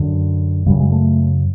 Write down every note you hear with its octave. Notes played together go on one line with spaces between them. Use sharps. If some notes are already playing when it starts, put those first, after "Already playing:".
Already playing: F#2 D3
F#2 C#3 G3
G#3
A3